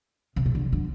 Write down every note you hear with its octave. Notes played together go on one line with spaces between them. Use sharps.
C3
A#2
D3
D3